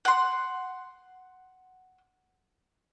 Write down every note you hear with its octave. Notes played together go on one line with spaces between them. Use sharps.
F#5 C6